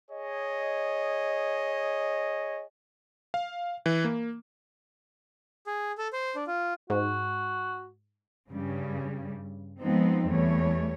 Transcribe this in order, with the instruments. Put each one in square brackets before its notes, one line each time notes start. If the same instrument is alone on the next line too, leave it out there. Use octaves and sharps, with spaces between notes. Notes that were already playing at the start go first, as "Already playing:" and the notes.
[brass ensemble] G#4 C#5 D#5
[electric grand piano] F5
E3
A#3
[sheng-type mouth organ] G#4
A4
C5
D4
F4
[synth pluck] G#2 [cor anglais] F#4
[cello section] G2 C#3 G3
F3 G#3 B3 C4 D#4
E2 G3 A3 C#5